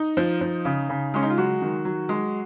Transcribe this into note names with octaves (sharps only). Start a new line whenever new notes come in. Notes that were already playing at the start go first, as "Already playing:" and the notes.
Already playing: D#4
F3
F3
C#3
C#3
G#3 C#4
D#4
F4
F#3 F#4
D#3
F#3
G#3